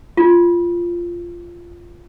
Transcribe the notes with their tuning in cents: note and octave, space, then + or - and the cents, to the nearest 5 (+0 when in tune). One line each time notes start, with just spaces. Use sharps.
F4 -10